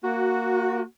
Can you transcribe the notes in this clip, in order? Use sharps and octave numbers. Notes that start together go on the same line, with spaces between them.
A#3 F#4